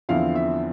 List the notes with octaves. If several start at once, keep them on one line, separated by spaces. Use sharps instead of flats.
E2 D3 F3 C4 E4 F5
E5